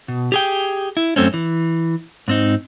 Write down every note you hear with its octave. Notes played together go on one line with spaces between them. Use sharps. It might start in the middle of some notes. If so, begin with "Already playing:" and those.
B2
G4 G#4 G5
E4
F#2 A3 C4 C#4
E3
G#2 C4 D#4